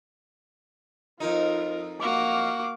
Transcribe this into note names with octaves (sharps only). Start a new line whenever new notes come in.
F2 D#4 F4 A#4
A#3 F#4 F5 D6